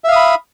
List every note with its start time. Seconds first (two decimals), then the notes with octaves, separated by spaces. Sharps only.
0.04 E5
0.08 F5
0.12 D#6
0.16 B5